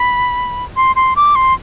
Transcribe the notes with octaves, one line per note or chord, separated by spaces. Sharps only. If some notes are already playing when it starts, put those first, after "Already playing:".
Already playing: B5
C6
C6
D6
C6